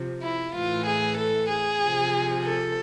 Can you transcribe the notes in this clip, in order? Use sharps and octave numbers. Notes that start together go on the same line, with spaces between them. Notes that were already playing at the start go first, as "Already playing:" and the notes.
Already playing: C3 F3
E4
A2 E3 F4
G#4
A4
G#4
C3 F3
A4